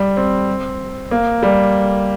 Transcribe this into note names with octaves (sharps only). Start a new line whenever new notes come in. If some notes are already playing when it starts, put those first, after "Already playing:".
Already playing: G3
C4
A#3
G3